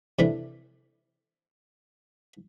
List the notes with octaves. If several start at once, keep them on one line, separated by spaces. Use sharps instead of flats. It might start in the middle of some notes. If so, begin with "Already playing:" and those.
C3 E3 A3 D4